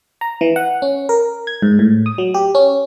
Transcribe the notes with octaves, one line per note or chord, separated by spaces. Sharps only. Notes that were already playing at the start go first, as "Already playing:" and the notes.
A#5
E3
F#5
C#4
A#4
G#6
G#2
A2
D#6
F#3
G4
C#4